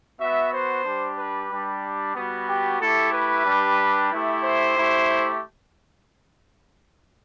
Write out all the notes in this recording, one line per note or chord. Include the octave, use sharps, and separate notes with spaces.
B3 F#4 E5
C5
G3 D4 G4
B4
G3 D4 G4
G3 B3 F#4
G4
A3 E4 G4 A4
B4
G3 D4 G4
A3 E4 G4
C5
A3 E4 G4